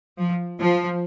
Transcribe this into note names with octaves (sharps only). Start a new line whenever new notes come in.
F3
F3